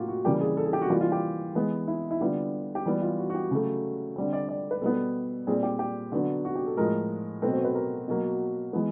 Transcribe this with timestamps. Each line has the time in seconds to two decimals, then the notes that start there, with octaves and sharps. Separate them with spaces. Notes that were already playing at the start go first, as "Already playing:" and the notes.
Already playing: A2 F#3 A#3 F4 G4
0.08 F#4
0.25 C#3 E3 G3 A#3 G4
0.41 G#4
0.57 A4
0.66 G#4
0.73 G4
0.81 F#4
0.90 E3 G3 A#3 F4
1.01 F4
1.12 G4
1.55 E3 G#3 B3
1.88 E4
2.11 E4
2.20 D3 G3 B3 F4
2.75 G4
2.86 E3 G3 B3 F#4
3.02 F4
3.18 F#4
3.30 F#4
3.35 G4
3.51 C#3 F#3 A3
4.16 D3 G3 C4
4.33 D5
4.49 D5
4.71 B4
4.82 B2 G3 B3 A4
5.47 A#2 G3 C4 G#4
5.63 G4
5.79 G4
6.12 D3 F#3 B3
6.45 F#4
6.55 G4
6.66 A4
6.77 A2 F3 G#3 A#4
7.42 B2 F#3 A3 C4 B4
7.53 C5
7.64 B4
7.75 A#4
8.08 B2 F#3 A#3
8.73 E3 G#3 B3